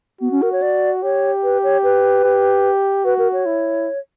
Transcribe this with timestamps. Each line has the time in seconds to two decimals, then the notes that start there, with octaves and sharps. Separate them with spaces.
0.21 B3 F#4
0.32 C#4
0.42 A#4
0.52 C#5
0.62 D5
1.03 G4 C#5
1.44 B4
1.63 C#5
1.84 B4
2.24 G4
3.05 F#4 B4
3.18 A#4
3.33 C#5
3.46 E4